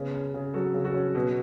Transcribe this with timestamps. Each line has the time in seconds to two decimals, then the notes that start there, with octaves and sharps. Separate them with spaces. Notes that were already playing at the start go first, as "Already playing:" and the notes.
Already playing: C#3 B3
0.14 C#4
0.34 C#3
0.54 F#3 F#4 A4
0.74 C#3
0.84 F#4 A4
0.94 C#4
1.15 B2